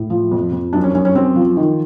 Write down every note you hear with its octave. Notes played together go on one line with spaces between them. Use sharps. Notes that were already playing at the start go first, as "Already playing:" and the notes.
Already playing: A2
F3
F2
F2
F#2 D4
C#4
F#2 C#4
C#4
F#2 C4
F3
D#3